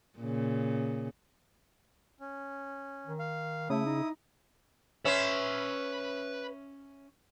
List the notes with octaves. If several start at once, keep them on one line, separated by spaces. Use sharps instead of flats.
A#2 C#3
C#4
D#3
F5
C#3 A3 E4 D#6
D#4
C#4 B4 E5 C6